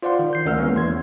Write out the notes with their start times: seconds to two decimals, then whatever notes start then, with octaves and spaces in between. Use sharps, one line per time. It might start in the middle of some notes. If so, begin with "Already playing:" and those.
0.03 F4 C5 D5 F5 F#5 C6
0.19 D#3
0.33 G6 C7
0.46 D2 C#4 A#4 F#5 E6 F6
0.58 E3 G#3 A#3 B3 C#4
0.74 E2 E3 C6 G#6